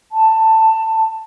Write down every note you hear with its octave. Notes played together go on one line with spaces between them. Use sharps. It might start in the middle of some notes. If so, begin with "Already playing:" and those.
A5